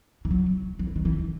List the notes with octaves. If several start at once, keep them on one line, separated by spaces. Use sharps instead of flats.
E3
F#3
F#3
E3
D#3
E3